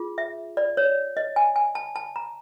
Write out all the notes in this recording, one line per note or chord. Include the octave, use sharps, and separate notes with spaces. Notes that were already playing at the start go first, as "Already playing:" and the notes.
Already playing: F4 G#4
E5
D5
C#5
D#5
G#5
G#5
A5
A5
A#5